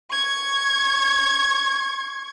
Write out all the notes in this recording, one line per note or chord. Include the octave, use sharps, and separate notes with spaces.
C#6 G#6